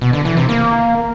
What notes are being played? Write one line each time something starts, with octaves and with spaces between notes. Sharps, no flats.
B2
D3
E3
C3
A#3